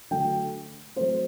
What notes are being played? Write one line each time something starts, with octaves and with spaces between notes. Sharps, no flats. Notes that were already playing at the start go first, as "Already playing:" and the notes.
D3 F#3 A3 G5
F#3 A3 C4 C5